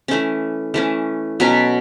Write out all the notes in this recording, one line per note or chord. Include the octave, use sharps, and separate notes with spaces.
E3 A3 C#4
E3 A3 C#4
B2 F#3 C#4